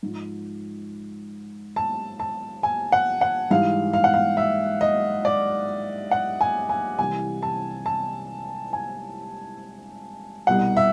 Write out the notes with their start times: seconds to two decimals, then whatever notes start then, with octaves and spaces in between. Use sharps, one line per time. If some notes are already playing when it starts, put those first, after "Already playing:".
0.03 G#2 F3
1.76 A5
2.20 A5
2.63 G#5
2.92 F#5
3.21 F#5
3.50 G#2 E3 G3 F5
3.93 F5
4.04 F#5
4.14 F5
4.37 E5
4.81 D#5
5.25 D5
6.11 F#5
6.41 G#5
6.69 G#5
6.99 C2 C3 E3 G#5
7.43 A5
7.86 A5
8.73 G#5
10.47 C2 B2 G3 F#5
10.77 E5